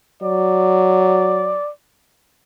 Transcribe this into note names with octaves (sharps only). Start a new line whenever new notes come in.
F#3 D5